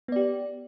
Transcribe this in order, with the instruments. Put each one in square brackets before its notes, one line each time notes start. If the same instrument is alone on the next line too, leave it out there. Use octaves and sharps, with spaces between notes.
[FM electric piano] B3
D5
G4